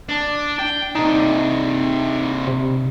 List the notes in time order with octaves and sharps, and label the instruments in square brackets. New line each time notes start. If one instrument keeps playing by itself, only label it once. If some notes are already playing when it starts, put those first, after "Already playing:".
[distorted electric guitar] D4
G5
[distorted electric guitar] C3 D4 [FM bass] D#4
[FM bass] C3